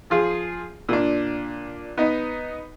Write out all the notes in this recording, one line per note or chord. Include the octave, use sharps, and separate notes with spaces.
F3 F4 G#4
A#2 D4
B3 D#4